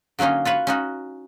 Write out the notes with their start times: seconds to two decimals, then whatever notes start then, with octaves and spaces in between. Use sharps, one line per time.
0.19 D3 F#3 A#3 C#4 D#4
0.45 F4 F#4 B4 C#5
0.67 C#4 D#4 F#4